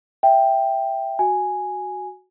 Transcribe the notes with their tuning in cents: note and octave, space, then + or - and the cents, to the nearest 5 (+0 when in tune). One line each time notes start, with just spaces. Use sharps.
E5 +0 G5 +0
F#4 +0 G#5 +0